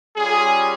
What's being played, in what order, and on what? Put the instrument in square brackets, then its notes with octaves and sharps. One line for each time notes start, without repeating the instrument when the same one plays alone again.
[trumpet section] G3 C#4 F4 G#4